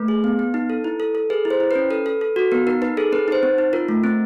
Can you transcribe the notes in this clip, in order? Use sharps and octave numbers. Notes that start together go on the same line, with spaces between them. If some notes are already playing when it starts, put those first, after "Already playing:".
Already playing: A3 B4
G#4
B3
B3
D#4
A4
E4
A4
A4
G#4 B4
E4
C5
E4
C#4 B4
A4 B4
A4
A4
F#4
B3 A#4
D#4 A#4
D#4 B4
G#4 A4
C4 B4
D#4 C5
C4
D#4
F4 A#4
A3
C4